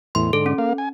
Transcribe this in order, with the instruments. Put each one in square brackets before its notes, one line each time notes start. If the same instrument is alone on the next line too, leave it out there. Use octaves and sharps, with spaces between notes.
[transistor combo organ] E2 A2 [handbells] C6
[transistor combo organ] G#2 D3 [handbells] A4
[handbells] C#4
[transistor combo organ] A#3 F5
G#5